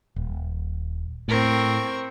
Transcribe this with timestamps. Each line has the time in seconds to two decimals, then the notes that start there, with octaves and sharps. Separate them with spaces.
0.16 D#1
1.28 A2 C4 A#4 C#6